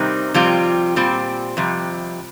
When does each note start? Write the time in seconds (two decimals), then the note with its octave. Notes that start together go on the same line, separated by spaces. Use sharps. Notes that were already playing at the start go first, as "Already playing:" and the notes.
Already playing: C3 D#3 G3 C4 D#4
0.34 F2 C3 G3 C4 F4
0.96 A#2 G3 C4
1.57 F2 C3 G3